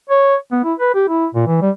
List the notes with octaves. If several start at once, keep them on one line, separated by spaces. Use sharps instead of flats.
C#5
B3
E4
B4
G4
E4
A#2
E3
G3